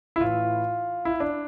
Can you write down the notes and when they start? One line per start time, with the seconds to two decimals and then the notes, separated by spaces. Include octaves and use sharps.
0.16 E4
0.20 A2 E3 F4
1.05 E4
1.20 D4